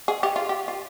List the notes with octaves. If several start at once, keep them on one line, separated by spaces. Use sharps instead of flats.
G#4
G4
F4
G4
F4